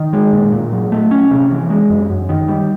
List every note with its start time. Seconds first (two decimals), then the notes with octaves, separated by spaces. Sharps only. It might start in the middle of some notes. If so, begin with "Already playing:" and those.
Already playing: D#3
0.13 G#3
0.33 A#2
0.52 A#2
0.72 F#3
0.92 A3
1.11 C#4
1.31 C3
1.51 E3
1.70 G#3
1.90 F#2
2.10 F#2
2.29 D#3
2.48 G3